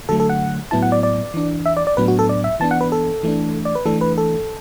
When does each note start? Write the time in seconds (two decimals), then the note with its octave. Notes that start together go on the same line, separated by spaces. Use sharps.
0.09 D3 F#3 A3 A4
0.20 A4
0.30 F#5
0.71 A2 F#3 B3 E4 A5
0.82 F#5
0.92 D5
1.03 D5
1.34 E3 D4
1.66 E5
1.77 D5
1.87 D5
1.97 A2 F#3 B3 D4 B4
2.08 F#4
2.19 A4
2.29 D5
2.44 E5
2.60 E3 B3 D4 A5
2.71 F#5
2.81 B4
2.92 A4
3.23 E3 A3 D4
3.65 D5
3.75 B4
3.85 E3 A3 D4 A4
4.01 B4
4.18 A4